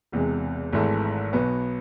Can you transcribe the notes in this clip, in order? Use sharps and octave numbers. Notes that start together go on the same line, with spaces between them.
E1 E2 C3 G#3
G#1 G#2 E3 A3
B1 B2 B3